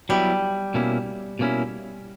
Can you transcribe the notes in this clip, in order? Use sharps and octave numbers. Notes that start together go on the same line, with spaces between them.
F#3 G3 B3 E4
B2 A#3 C#4 E4
B2 A#3 C#4 E4